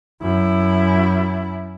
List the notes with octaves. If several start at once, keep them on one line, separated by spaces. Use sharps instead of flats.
F#2 E4